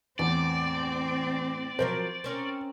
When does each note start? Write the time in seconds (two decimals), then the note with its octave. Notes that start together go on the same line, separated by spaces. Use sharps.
0.19 E2 A2 C4 D5
1.79 F3 F#3 A#4 C5
2.24 C4 C#4 A#4